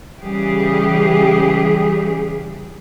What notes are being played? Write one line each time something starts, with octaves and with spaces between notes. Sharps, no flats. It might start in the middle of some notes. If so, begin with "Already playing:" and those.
C#3 E3 G3 G4 G#4